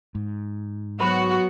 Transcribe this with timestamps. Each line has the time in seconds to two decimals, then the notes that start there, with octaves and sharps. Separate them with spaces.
0.15 G#2
1.00 F#3 B3 F#4 A#4 C5 B5